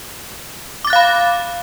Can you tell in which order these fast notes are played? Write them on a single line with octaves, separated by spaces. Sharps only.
D6 A6 F#6 F5 B5